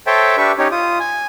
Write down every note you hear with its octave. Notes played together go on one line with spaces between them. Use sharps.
A4 C5 C#5 E5 G5 A5
D4 G4 B4 E5 C#6
C#4 D#4 G4 C#5
F4 D#6
G#5